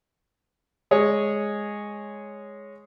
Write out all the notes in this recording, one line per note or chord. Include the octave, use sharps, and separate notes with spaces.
G#3 G#4 C#5